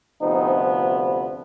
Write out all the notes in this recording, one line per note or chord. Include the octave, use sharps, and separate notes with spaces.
D2 C3 F3 B3 C4 D#4